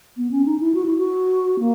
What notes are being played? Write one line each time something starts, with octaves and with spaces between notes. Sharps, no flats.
B3
C#4
D#4
E4
F#4
E4
F#4
A#3